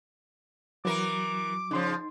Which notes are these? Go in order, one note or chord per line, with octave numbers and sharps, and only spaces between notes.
E3 F#3 E4 A#4 D6
C#3 F3 D#4 C6